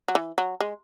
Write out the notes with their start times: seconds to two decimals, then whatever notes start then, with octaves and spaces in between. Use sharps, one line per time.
0.08 F#3
0.15 E3
0.38 F#3
0.60 G#3